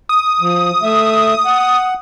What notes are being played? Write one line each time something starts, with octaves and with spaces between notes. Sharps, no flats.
D#6
F3
A3 E5
F#5